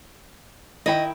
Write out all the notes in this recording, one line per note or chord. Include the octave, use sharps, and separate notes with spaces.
D#3 E4 D#5 G5